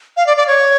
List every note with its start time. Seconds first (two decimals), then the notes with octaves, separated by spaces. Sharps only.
0.17 F5
0.27 D5
0.37 D5
0.47 C#5